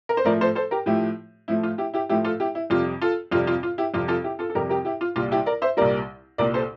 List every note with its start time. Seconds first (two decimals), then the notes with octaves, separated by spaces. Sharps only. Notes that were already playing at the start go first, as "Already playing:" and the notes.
0.09 A#4
0.17 C5
0.25 A2 F3 A3 A#4 D5
0.41 A4 C5
0.55 A4 C5
0.71 G4 A#4
0.86 A2 F3 A3 E4 G4
1.48 A2 F3 A3 E4
1.63 F4
1.78 E4 G4
1.94 E4 G4
2.09 A2 F3 A3 E4 G4
2.24 F4 A4
2.40 E4 G4
2.55 E4
2.70 F2 C3 G3 F4
3.01 F4 A4
3.31 F2 C3 G3 F4
3.47 F4
3.63 F4
3.78 E4 G4
3.94 F2 C3 G3 F4
4.08 F4 A4
4.24 E4 G4
4.39 F4 A4
4.50 A4
4.55 F2 C3 G3 G4 A#4
4.69 G4 A#4
4.85 E4 G4
5.01 F4
5.16 C2 A#2 G3 F4
5.32 E4 G4
5.46 A#4 D5
5.62 C5 E5
5.77 C2 A#2 G3 A#4 D5
6.38 C2 A#2 G3 A#4 D5
6.54 A4 C5